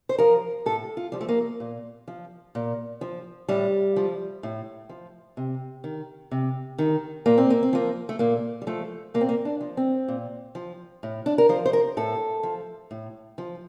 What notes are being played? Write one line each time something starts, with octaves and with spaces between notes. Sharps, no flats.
C5
F3 A#4
A2 A4
F4
F3 G3
A3
A#3
A#2
F3
A#2
F3
A2 G3
F3
A2
F3
C3
D#3
C3
D#3
A#2 A#3
C4
A#3
C4
F3 A#3
A3
A#2 A#3
G3
F3 A3
A#2 A#3
C4
A#3
D4
F3
C4
A#2
F3
A2
D4
A#4
F3 C5
C5
A#4
A2 A4
F3
A2
F3